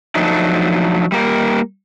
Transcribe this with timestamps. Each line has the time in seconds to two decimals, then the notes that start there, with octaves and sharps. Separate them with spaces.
0.15 F3 F#3 A3 D4 D#4
1.12 G3 A#3 A#4